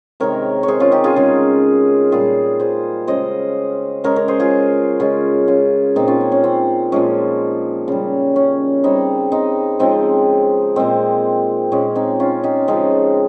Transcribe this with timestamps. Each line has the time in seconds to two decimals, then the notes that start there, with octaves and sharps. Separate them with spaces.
0.20 C3 D#3 G#3 A#4 C#5
0.63 C#5
0.68 G#4 C5
0.80 C#4 F4
0.92 D#4 G4
1.04 F4 G#4
1.16 C#3 G#3
2.12 A#2 G3 F4 G#4
2.60 G#4 C5
3.07 C#3 G#3 C5 D#5
4.04 C#3 G#3 A#4 C#5
4.16 A#4 C#5
4.28 G#4 C5
4.40 F4 G#4
5.00 C#3 G#3 C#4 F4
5.48 C#4 F4
5.96 A#2 G#3 C4 D#4
6.08 C#4 F4
6.21 C4
6.32 C#4
6.44 C4
6.92 A#2 F3 G#3 C#4
7.88 C#3 G3
8.36 C#4
8.84 C#3 G3 C4 D#4
9.32 C4 D#4
9.79 C#3 F3 G#3 C4 D#4
10.76 A#2 G#3 C4
11.72 A#2 G#3 C#4
11.95 C4 D#4
12.20 C#4 F4
12.43 D#4 G4
12.68 C#3 F3 G#3 C4 D#4